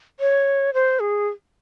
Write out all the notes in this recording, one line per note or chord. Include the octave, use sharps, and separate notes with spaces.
C#5
C5
G#4